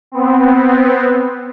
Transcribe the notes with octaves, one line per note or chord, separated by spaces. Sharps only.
B3 C4